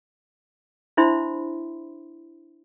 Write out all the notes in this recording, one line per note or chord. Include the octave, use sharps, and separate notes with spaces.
D4 E4 C5 E5 B5 C6